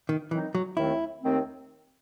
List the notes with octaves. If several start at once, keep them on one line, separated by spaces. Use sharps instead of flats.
D#3
D#3 E3 F#3 C4 D#4
F#3
D#2 D#3 A3 C4 E4
D#2 D#3 A3 C4